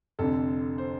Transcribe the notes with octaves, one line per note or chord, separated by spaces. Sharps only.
F1 F2 D3 A4
C5